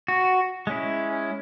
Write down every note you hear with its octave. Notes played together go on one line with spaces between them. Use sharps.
F#4
G#3 C#4 E4